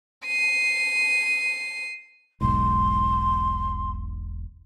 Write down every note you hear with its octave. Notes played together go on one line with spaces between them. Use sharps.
C7 D#7
E1 B1 G#2 C6